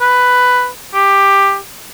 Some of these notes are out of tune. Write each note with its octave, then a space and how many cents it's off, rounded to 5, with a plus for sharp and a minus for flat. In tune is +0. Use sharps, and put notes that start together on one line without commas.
B4 +10
G4 +10